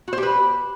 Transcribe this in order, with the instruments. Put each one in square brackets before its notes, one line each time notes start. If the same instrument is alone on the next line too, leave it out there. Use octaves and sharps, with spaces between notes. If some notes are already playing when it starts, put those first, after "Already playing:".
[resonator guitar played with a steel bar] F#4
C5
G4
B4